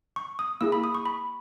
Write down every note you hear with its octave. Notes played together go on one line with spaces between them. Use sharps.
C#6
D#6
A#3 E4 G#4 E6
B5
D#6
C#6
B5